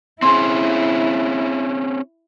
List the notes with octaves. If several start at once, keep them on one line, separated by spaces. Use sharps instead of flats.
C4 C#4 E4 G#4 C6